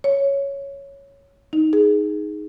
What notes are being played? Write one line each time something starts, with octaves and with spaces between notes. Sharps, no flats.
C#5
D#4
G#4